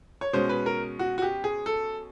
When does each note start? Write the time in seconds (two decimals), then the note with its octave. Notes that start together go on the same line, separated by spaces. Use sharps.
0.21 C#5
0.33 B2 G#3 C#4 C5
0.49 B4
0.66 A#4
0.99 F#4
1.18 F#4
1.22 G4
1.44 G#4
1.66 A4